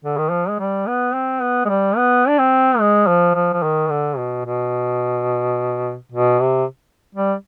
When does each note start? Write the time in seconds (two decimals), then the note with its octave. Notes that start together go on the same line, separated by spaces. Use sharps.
0.05 D3
0.18 D#3
0.31 F3
0.49 G#3
0.59 G3
0.87 B3
1.14 C4
1.42 B3
1.65 G#3
1.69 G3
1.97 B3
2.28 D4
2.39 C4
2.79 G#3
3.07 F3
3.35 F3
3.53 F3
3.63 D#3
3.90 D3
4.18 B2
4.46 B2
6.12 B2
6.40 C3
7.15 G3